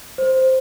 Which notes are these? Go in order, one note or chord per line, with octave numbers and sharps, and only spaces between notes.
C5